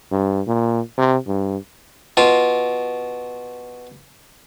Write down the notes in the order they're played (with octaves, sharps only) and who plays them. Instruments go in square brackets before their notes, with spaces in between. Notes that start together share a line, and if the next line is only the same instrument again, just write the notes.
[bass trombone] G2
A#2
C3
G2
[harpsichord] B2 F4